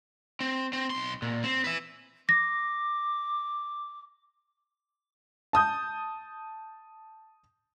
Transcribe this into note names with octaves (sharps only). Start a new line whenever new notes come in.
C4
C4
B1 C6
A#2
C4
B4 E5
D6 A#6
A5 D#6 G6